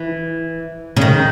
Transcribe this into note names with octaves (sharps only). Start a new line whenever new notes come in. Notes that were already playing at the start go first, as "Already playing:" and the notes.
Already playing: E3
C#3
D#3